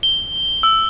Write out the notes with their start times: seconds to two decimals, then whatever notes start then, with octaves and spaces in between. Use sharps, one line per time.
0.03 G7
0.63 E6